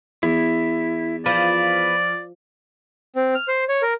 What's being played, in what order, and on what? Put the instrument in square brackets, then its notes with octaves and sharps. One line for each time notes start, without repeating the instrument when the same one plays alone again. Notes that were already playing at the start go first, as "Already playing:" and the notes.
[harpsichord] E2 [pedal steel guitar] E4
[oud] F3 [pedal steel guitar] B4 [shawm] D5
[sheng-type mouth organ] C4
F6
C5
C#5
A#4